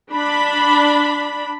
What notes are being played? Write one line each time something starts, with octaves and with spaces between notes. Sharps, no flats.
D4 B5